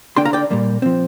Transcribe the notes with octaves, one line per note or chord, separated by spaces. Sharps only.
D3 A#3 D4 G5 C6
F5 A#5
D5 G5
A#2 G3 A#3
F3 C4